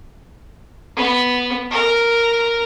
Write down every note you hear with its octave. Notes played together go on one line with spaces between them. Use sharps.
B3
A#4